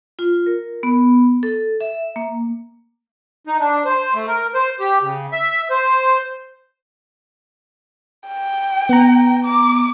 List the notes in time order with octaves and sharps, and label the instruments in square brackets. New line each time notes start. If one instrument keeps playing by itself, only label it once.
[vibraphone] F4
A#4
B3
A4
E5
A#3
[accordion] D#4
D4
C5
A3
A#4
C5
G4
C#3
E5
C5
[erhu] G5
[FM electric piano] B3 A#5
[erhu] D6